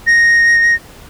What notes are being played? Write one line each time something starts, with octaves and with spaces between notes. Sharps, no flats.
A#6